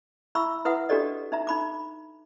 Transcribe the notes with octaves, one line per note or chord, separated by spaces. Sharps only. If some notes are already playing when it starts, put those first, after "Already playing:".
E4 E5 B5 C#6 E6
E4 B4 E5 F#5 D#6
D4 F#4 G4 A4 D5 D#5
D#4 E5 A#5
D#4 B5 D6